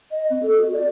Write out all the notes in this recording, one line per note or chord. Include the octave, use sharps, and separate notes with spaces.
D#5
C4
A4
F#4
D5